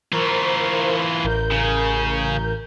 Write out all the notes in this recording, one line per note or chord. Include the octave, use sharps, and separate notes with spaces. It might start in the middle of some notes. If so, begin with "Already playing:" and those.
E3 F4 A#4 C5 C#6
A1 A#4 G6
C#3